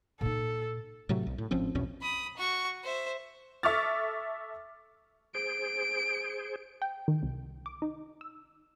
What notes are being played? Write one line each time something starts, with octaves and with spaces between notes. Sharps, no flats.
A#2 D#4 A4
A2 C3 F#3 A3
B1
A2
G#1 F3 C4 C#4
A#1 E2 B2 C#4
B5 D#6
F#4 C#6
C5 E5
A4 E5 C#6 D6 F6 A6
G#4 C5 D7
G5
D#3
C2
D6
D#4
E6